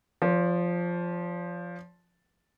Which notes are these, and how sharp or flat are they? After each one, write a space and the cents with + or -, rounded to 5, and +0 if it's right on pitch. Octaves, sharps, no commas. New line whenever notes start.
F3 +0 D5 -45